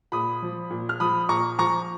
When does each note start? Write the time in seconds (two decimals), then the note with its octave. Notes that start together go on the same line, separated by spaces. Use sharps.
0.12 A#2 B5 D#6
0.42 F3
0.71 A#2
0.89 F6
1.00 F3 B5 D#6
1.29 A#2 A#5 C#6
1.59 F3 A#5 C#6